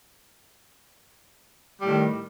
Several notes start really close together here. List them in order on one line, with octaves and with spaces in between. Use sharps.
G3 A2 D#3